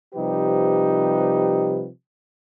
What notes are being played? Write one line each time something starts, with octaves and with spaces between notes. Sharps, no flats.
C3 F3 G3 D#4 G4 B4